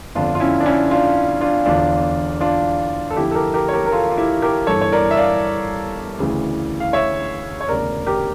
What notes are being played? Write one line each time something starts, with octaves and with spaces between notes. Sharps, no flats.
G1 F2 D3 D4 F4
F4
C#4 E4
D4
C#4 E4
D4 F4
D4 F4
E1 E2 D3 D4 F4
D4 F4
A4
F1 F2 D3 E4 G4
A4
G4 A#4
G4 A#4
C#5
G4 A#4
A#4
F4 A4
F4
E4 G4
G4 A#4
G1 G2 E3 A4 C#5
C#5
A#4 D5
E5
D5 F5
D2 C#3 E3
F5
C#5 E5
C#5
E1 D2 C#3 A#4 D5
G4 A#4